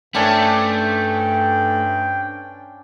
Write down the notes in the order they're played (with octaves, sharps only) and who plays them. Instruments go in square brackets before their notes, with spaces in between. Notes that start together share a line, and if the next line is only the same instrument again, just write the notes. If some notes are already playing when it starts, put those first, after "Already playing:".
[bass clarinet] G2 [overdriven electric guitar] A3 [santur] C#4 D4 C5 [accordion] G5